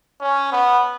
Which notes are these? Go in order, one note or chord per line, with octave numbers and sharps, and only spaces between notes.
C#4
B3